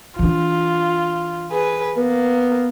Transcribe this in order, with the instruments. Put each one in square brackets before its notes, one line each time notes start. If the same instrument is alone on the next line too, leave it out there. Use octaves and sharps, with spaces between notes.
[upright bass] E3 D4 [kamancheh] F4
[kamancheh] G#4 B4
[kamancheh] A#3 [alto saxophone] B3